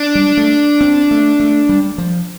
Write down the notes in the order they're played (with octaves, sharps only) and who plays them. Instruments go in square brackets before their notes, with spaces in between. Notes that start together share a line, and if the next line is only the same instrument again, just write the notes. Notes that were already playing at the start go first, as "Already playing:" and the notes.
Already playing: [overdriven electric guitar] D4
[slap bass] G3
A3
C4
A3
A3
G3
F3